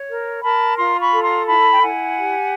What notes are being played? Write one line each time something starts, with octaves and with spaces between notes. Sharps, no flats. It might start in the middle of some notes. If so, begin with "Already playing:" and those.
Already playing: C#5
A#4
A#4 A5 B5
F4 A#5 C6
B5 C#6
A4
A#5 C6
E4 A5 B5
G5
E4 F#5 G#5
G4